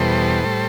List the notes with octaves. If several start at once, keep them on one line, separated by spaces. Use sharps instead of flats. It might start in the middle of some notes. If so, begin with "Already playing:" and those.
Already playing: E2 B2 G3 A4 C5
A2 G3